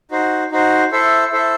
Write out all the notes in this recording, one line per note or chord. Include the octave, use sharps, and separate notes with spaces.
D#4 F#4 C5
D#4 F#4 C5
E4 A4 C5 E5
E4 A4 C5 E5